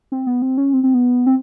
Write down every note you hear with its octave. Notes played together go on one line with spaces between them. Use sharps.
C4
B3
C4
C#4
C4
C4
B3
C4